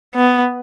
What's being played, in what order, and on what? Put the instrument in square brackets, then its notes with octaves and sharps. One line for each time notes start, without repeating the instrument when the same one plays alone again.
[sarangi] B3